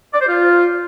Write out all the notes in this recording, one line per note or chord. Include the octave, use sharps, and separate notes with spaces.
D5
C5
F4